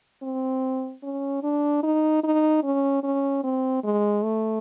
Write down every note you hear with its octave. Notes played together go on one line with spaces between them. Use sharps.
C4
C#4
D4
D#4
D#4
C#4
C#4
C4
G#3
A3